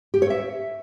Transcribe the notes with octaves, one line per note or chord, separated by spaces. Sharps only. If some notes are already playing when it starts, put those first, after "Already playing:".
G4
C#5
E5